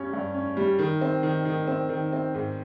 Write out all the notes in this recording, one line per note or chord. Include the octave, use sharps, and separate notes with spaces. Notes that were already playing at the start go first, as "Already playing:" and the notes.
Already playing: G2 G3 C#4
G2
C#4
G3
D#3
C4
D#3
D#3
C4
D#3
C4
G#2